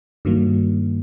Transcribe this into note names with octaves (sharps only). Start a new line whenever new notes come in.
G2 D#3 F#3 A#3